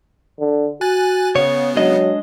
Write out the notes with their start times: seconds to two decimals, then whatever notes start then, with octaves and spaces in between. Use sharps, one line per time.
0.40 D3
0.81 F#4 G#5 F#6 A6
1.36 C#3 B3 C#5
1.76 F#3 G#3 D4 D#5